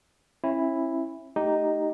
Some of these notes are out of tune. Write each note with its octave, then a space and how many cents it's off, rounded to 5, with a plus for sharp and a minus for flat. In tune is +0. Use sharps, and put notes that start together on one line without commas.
C#4 -40 E4 +0
A3 +0 D#4 +0 G4 -10